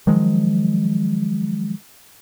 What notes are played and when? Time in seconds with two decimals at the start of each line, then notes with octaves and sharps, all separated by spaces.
0.07 D#3 F3 F#3 G#3